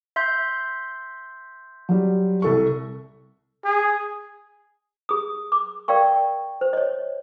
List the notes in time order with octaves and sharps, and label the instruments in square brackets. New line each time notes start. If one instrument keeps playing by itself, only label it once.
[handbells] E5 C6 G6
[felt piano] F#3 G3
C2 A4 C#6
[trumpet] G#4
[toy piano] G#4 D#6
D6
A#4 D5 F5 G5 C#6
C5
C#5 D#5